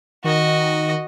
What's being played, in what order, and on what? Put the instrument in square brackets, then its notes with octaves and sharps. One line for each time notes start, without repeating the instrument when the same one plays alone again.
[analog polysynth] D#3 [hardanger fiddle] F#4 D#5